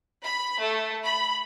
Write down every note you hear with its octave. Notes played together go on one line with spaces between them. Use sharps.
B5
A3
B5